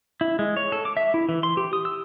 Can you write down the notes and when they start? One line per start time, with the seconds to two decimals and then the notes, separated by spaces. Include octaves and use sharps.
0.21 E4
0.39 G#3
0.57 C#5
0.72 A4
0.85 D6
0.97 E5
1.14 E4
1.29 E3
1.43 C6
1.57 G4
1.73 D#6
1.85 E6